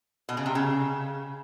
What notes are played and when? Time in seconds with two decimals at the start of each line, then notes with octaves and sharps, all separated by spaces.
0.29 B2
0.37 C#3
0.46 C3
0.55 C#3